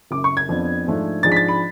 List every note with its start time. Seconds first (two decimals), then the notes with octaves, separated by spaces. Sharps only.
0.11 F#1 F#2 C#3 D6
0.24 C#6
0.37 G#6
0.49 F2 F3 B3 D4
0.86 G#2 F3 A3 D4
1.23 G#2 F3 G#3 D4 A6
1.32 B6
1.36 A6
1.48 B5